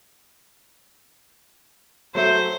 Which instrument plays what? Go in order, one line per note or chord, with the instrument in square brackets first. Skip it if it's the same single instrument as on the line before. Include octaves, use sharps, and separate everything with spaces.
[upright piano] F#3 A3 E5 [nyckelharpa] C5